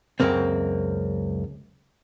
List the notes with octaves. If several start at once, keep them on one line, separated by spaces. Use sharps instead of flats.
C#2 F#2 A#3 C4